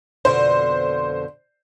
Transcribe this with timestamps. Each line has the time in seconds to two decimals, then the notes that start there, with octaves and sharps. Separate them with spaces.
0.25 F2 B2 D3 C5